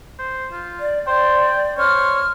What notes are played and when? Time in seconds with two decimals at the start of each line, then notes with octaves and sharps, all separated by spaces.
0.19 C5
0.52 F4
0.80 D5
1.07 C5 D5 G5
1.78 C5 C#5 F6